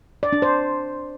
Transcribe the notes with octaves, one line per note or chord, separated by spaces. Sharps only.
D5
D4
C5